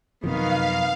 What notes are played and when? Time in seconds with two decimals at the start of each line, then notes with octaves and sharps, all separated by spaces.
0.24 F#2 C3 D#3 F3 B3 F5